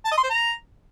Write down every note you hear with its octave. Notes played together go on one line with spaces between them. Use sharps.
A5
D#5
C6
C5
A#5